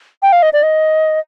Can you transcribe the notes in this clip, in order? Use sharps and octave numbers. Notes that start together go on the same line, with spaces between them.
G5
F5
D#5
D5
D#5